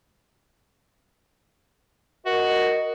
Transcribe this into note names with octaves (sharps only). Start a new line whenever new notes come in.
F#4 A#4 D#5